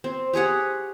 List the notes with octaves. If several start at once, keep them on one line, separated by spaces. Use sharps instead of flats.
C4
G4 G#4 C#5 F#5